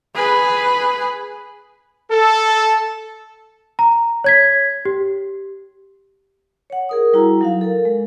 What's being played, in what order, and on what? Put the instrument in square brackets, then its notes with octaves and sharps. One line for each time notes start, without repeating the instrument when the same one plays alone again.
[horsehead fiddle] G#4 B4
[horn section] A4
[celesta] A#5
C#5 G#6 B6
G4
[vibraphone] C#5 F#5
G#4 A#4 D#6
G3 E4 F#4 A#5
F#3 D#4 F5
A4 A#4
G#3